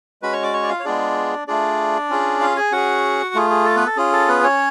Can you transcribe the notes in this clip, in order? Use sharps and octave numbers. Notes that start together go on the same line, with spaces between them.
G#3 C#4 F#4 B4 B5
C#5 C#6
D5 D6
C#5 C#6
D5
F4 F5
C#5
G#3 B3 D4 F4 G#4 D5
A3 D4 F4 G#4 D5
C#4 F4 G#4
F4 F5
G#4 G#5
C#4 F#4 G#4 F#5
A3 F4 G#4
G#4
A4
B3 B4
A4
C#4 F4 G#4
A4
B3 B4
C#4 C#5